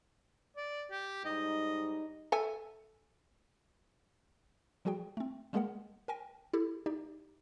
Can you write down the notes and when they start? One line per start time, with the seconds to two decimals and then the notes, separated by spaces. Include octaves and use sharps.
0.56 D5
0.91 G4
1.25 G#2 G3 D#4 D#5
2.32 A4 E5 G#5
4.85 F3 G3 F#4 G#4 G5
5.17 A3 C4
5.53 G3 G#3 A#3 G#4 A#4 F#5
6.08 A#4 G5 G#5 A#6
6.53 E4 G4 A4
6.86 D#4 G4 D5